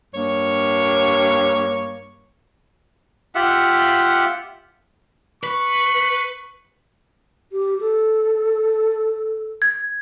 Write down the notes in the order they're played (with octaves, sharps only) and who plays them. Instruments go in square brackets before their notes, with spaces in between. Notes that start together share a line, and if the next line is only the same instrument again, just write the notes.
[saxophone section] G2 A#3 C#5
[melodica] F4 G4 E5 F#5
[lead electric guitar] B4 [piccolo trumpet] C#6
[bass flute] G4
A4
[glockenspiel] G#6